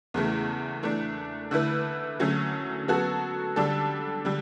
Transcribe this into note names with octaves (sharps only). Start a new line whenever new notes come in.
E2 C#3 E3 A3
E3 A3 D4
D3 A3 E4 B4
D3 F#3 A3 C#4
F#3 B3 F#4 A4
D3 G3 D4 A4
D3 G3